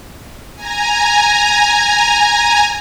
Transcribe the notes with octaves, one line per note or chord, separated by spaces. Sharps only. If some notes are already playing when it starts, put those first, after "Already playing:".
G#5 A#5